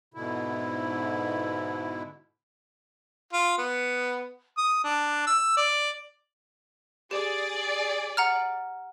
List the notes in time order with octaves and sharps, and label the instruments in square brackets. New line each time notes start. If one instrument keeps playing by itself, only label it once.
[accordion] G#2 B2 D3 E4
[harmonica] F4
B3
D#6
D4
E6
D5
[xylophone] G4 [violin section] G#4 D5
[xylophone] F#5 A#5 F6